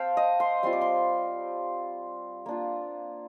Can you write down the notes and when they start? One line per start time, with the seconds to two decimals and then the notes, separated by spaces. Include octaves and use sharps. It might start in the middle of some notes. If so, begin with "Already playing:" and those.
Already playing: C4 F5 G5 A5
0.17 D#5
0.40 C6
0.63 G3 C4 F4 C6
0.73 D6
0.81 C6
2.46 A#3 D4 F4